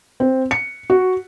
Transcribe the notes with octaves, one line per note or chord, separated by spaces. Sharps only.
C4
C#7
F#4